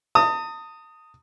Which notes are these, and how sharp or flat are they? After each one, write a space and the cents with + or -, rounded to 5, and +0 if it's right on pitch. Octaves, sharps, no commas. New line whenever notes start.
A5 +45 D#6 +0